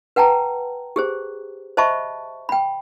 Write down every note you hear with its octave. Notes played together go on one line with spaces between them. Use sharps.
B4 F#5 G5 A5 A#5
G4 G#4 C5
C5 D#5 E5 A5 B5 C#6
G5 B5